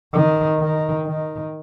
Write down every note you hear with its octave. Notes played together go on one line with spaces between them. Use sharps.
D#3
D#3
D#3